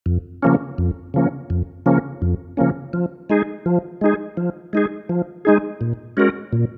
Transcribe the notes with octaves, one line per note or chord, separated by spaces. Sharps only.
F2
C#3 F3 A#3 C#4
F2
C#3 F3 A#3 C#4
F2
C#3 F3 A#3 C#4
F2
C#3 F3 A#3 C#4
F3
G#3 D#4 G#4
F3
G#3 D#4 G#4
F3
G#3 D#4 G#4
F3
G#3 D#4 G#4
A#2
G#3 C#4 F#4 A#4
A#2